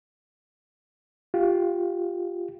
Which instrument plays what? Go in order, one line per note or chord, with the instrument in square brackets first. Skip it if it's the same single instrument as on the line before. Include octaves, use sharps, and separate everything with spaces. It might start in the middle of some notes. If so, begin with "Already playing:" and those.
[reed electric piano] F4 G4